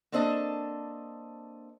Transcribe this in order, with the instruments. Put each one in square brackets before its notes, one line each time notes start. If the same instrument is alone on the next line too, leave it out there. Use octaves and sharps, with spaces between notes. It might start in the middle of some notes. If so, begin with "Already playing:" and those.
[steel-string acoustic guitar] A#3 C4 D4 A4 D#5 A5